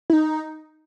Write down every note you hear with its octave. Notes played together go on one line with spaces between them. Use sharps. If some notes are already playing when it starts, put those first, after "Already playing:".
E4
D#4